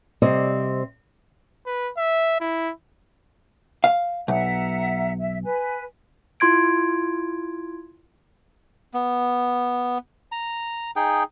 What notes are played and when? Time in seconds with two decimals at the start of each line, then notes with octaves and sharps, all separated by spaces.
0.22 C3 G3 C4 D5 D#5
1.66 B4
1.97 E5
2.41 E4
3.84 F5
4.28 B1 E5 F#5 A#5
5.19 E5
5.44 B4 G#5
6.40 E4 F4 C6 G#6 D7
8.94 B3
10.32 A#5
10.96 D#4 G#4 G5